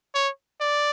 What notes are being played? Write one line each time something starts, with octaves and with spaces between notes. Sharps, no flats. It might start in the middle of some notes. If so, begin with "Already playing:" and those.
C#5
D5